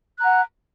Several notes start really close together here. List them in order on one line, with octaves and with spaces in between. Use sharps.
F#6 A#5 F#5